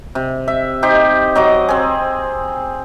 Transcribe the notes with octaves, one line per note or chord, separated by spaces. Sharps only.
C3
E5
D#4 G4 C5
F#3 D#5 D6
C4 G#4